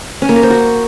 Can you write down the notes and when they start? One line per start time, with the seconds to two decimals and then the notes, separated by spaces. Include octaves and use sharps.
0.22 C#4
0.29 A#3
0.36 A#4
0.43 C5
0.50 F#4